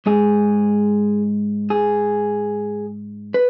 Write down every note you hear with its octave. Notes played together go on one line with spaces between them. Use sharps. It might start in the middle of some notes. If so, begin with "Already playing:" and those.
G#2 G#3 G#4
G#4
B4